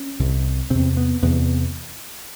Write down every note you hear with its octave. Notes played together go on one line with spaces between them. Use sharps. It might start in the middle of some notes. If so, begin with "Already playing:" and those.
Already playing: C#4
C2 C3
E2 C3 C4
B3
E2 C3 B3